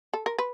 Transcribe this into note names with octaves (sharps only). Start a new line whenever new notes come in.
A4
A#4
B4